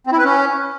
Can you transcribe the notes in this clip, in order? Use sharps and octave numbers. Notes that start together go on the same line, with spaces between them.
C4
E4
B4
C#4